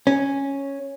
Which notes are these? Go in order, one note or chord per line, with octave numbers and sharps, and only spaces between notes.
C#4